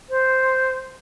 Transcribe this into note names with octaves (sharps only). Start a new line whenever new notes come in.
C5